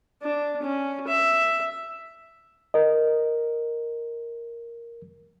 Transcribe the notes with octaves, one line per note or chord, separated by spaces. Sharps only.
D4
C#4
E5
A#4 D#5